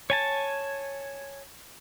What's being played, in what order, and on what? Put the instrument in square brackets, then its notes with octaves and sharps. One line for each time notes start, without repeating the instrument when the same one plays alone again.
[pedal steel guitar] C#5 G#5 A5